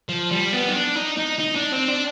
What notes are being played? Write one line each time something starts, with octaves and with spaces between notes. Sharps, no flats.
F3
G3
B3
D#4
D4
D#4
D#4
D#4
D4
C4
D4